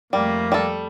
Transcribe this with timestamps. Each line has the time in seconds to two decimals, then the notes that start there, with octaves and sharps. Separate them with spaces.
0.13 F2 G3 A3 A#3
0.52 G3 A4